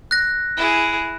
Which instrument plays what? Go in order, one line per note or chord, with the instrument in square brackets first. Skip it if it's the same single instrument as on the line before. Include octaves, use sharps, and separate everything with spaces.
[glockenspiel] F#6 A#6
[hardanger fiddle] E4 G#4